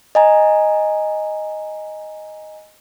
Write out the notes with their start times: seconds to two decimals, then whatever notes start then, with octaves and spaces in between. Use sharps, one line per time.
0.15 D#5 G#5 A#5